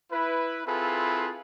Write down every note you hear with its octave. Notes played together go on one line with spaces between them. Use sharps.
E4 B4
C4 E4 F4 G#4 A4 B4